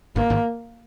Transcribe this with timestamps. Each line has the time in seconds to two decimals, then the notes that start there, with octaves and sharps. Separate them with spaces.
0.16 G1 G2 A#3
0.30 G#1 G#2